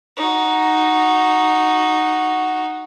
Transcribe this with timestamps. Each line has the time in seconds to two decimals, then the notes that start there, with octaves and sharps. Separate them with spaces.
0.17 D#4 F#4